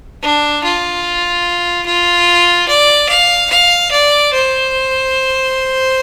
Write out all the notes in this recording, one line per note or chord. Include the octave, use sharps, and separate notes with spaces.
D4
F4
F4
D5
F5
F5
D5
C5